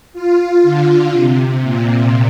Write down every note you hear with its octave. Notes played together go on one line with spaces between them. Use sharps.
F4
D3
C3
A#2